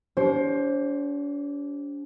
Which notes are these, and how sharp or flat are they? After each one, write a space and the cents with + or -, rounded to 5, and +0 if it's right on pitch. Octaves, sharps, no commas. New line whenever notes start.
D4 -45 G4 -15 C5 +20